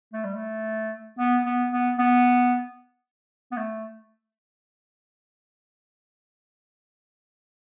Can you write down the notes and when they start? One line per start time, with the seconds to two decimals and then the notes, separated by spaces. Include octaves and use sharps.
0.13 A3
0.24 G3
0.35 A3
1.19 B3
1.46 B3
1.71 B3
1.98 B3
3.52 B3
3.57 A3